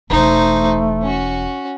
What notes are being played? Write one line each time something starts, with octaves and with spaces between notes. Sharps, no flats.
E1 E3 A3 D#4 C5
C#4 F#4